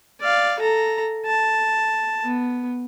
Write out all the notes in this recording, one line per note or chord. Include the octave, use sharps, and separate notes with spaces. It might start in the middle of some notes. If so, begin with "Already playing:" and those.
D5 F5
A4 A#5
A5
B3